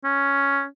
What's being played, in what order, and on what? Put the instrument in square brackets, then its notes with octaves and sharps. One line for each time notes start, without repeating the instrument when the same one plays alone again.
[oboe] C#4